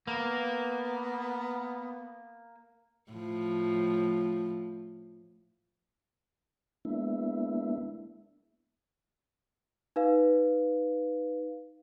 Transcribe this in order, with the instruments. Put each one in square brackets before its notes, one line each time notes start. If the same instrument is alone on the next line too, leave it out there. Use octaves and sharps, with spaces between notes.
[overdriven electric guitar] A#3 [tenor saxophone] B3
[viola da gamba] A2 F3
[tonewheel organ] G#3 A#3 B3 D4 E4 E5
[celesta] D#4 B4 F5